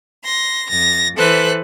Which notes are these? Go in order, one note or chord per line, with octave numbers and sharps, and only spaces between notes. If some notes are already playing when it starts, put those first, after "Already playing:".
C6 A#6
F2 A6 A#6
E3 A4 B4 C5 F#6